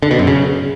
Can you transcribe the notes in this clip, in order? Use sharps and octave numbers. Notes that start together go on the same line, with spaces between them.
D3
B2
F#2
C#3